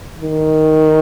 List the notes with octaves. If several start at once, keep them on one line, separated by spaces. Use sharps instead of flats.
D#3